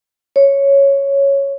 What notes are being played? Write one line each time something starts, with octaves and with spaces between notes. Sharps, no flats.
C#5